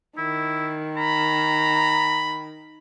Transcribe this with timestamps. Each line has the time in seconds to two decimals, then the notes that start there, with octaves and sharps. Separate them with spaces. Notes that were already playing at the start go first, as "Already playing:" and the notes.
0.18 D#3 E4
0.97 A#5 B5